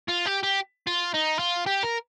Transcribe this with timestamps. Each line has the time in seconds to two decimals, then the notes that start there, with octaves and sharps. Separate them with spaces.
0.09 F4
0.27 G4
0.43 G4
0.87 F4
1.14 D#4
1.39 F4
1.66 G4
1.83 A#4